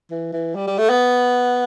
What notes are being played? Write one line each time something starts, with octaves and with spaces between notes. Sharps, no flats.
E3
E3
G3
G3
A3
B3